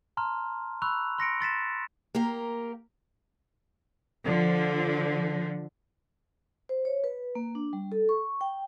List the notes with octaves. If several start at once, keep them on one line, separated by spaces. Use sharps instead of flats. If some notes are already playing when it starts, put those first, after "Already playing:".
A5 A#5 C6 F6
B5 C#6 E6 F#6 F7
C6 A#6 C#7 D7
C6 A6 B6 E7
A#3 G4 A#4 F5
D3 F3
C5
C#5
B4
A#3
D4
G3
A4
C#6
G5